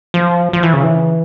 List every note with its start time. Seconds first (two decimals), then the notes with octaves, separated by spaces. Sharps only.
0.14 F3
0.53 F3
0.63 E3
0.73 C#3
0.84 E3